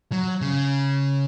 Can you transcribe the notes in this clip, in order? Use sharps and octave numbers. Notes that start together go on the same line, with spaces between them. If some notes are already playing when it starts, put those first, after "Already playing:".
F#3
C#3